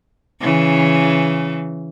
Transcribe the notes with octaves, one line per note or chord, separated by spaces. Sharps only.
C#3 E3